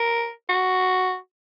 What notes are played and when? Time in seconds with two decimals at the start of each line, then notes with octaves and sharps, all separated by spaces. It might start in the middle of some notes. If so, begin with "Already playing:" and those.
Already playing: A#4
0.49 F#4